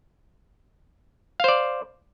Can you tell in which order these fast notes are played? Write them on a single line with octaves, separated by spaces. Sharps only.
F5 C5 D5